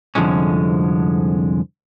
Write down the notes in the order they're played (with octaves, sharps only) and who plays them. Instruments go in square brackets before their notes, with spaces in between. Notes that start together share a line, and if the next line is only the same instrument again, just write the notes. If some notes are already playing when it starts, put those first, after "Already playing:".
[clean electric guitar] C2 F2 D3 F3 G#3 C#4